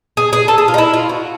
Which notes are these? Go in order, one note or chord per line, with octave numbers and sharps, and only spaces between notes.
G#4
G#4
A4
G#4
F4
D#4
E4
F4
F#4